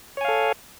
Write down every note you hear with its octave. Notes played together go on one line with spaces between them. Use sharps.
A4 C#5 F5 G#5